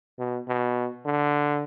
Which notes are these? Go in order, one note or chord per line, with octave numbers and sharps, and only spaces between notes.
B2
B2
D3